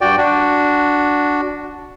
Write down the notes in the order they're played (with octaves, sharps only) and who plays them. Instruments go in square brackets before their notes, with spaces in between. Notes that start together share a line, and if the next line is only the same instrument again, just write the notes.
[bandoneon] G2 F#4 D5 G5
D4 F#4